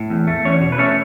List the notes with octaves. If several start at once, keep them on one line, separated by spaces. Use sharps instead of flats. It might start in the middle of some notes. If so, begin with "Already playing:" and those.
Already playing: A2
E2
A3
E2 C#4 C#5
B2
B4
A3 C#4 C#5